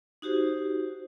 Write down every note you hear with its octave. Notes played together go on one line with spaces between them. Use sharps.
D#4 F#4 G4 C5